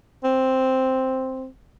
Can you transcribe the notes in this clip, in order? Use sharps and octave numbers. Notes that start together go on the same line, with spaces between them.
C4